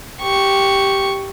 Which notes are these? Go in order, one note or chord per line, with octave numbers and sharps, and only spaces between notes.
G4 C#6